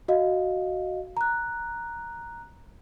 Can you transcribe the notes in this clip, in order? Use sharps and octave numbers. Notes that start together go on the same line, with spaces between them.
F#4 D#5 F5
A#5 F#6